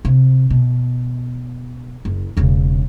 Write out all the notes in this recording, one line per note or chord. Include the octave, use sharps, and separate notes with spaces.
C3
B2
F#1
E1 C#3